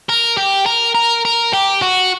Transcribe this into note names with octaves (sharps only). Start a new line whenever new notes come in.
A#4
G4
A#4
A#4
A#4
G4
F#4